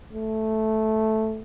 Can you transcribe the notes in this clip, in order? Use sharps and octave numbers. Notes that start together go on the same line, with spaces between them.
A3